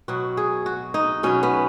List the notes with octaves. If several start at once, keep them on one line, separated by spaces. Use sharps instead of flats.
B2 F#3 F#4
G#4
F#4
D#4
B2 F#3 C#4
B3